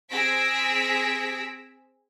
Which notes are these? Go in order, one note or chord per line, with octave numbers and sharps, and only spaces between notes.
C4 G#4 E6 A#6 B6 D7